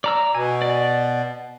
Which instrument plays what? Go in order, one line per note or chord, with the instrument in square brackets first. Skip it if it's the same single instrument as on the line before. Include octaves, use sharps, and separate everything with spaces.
[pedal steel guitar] D5 A#5 E6
[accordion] B2 [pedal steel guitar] G#5
[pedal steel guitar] D5